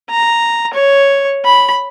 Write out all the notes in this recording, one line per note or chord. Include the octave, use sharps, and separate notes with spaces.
A#5
C#5
B5